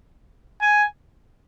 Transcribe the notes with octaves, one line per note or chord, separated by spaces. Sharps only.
G#5